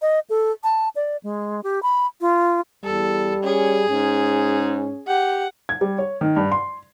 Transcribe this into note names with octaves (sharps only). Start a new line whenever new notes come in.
D#5
A4
A5
D5
G#3
G4
B5
F4
E2 G3 A4
C#4 G#4
G#2 C#4
G4 F#5
G#6
G3
C#5
D#3
G2
C6